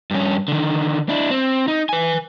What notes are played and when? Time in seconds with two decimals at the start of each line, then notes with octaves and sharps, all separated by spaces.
0.11 G2 C#4
0.48 D3 D#3
1.09 D4 E4
1.31 C4
1.68 D#4
1.89 B4 G#5